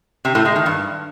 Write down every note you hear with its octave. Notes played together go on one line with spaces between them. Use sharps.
C3
A2
G#3
D#3
G2